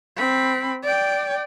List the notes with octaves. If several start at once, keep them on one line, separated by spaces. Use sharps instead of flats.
C4 B5
D5 G5